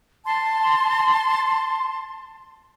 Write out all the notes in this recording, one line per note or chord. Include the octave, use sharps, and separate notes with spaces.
A5 C6